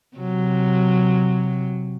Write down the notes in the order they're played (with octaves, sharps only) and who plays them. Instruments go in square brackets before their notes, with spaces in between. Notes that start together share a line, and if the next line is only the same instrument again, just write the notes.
[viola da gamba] C3 F#3